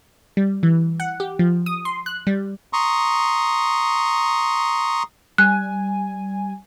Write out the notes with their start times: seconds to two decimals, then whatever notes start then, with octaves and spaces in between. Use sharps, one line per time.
0.37 G3
0.63 E3
1.00 F#5
1.20 G4
1.39 F3
1.66 D#6
1.85 C6
2.06 F#6
2.27 G3
2.73 A#5 C6 C#6 D#6
5.38 G3 G#5 F#6